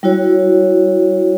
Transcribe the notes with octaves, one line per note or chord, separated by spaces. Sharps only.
G3 E4 F#4 C#5